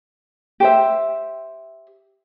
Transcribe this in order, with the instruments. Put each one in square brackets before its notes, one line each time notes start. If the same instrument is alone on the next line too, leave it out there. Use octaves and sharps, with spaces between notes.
[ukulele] G4 C5 E5